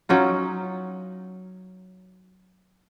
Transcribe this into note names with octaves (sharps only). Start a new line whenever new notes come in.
F#3 C#4 D#4 F4